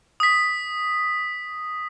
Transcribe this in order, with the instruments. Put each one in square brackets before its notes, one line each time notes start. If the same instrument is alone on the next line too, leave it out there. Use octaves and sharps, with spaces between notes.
[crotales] D#6 B6